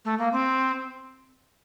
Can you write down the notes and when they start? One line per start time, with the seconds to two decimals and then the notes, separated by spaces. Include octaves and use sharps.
0.05 A3
0.19 A#3
0.32 C4